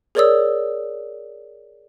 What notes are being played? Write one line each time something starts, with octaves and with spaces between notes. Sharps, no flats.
G#4 A#4 C#5 D5 D#6 E6